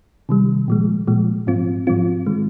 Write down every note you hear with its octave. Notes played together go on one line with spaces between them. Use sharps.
C3 D#3 G3
A#2 F3 G#3
A#2 F3 G#3
G#2 F3 C4 F4
G#2 F3 C4 F4
D#3 G#3